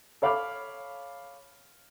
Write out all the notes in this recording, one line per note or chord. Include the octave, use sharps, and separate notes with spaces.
A4 C#5 F5 B5 D6 F6